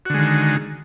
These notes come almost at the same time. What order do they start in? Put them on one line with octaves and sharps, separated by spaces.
F#4 D3 G#3 D#3